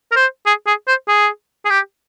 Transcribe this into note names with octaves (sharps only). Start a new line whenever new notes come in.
A#4
C5
G#4
G#4
C5
G#4
G#4
G4